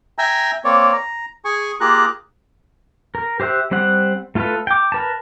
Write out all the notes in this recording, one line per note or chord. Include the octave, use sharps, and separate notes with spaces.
E5 G5 G#5 A#5 E6
A#3 C4 C#5 D5
A#5
G#4 G#5 C#6
A#3 F4 G4 G#4 A#5 F#6
A#4
G4 C5 E5 F#6
G3 C4 C5 F#5
A3 F4 A4 B4
G5 D6
A#4 B4 A5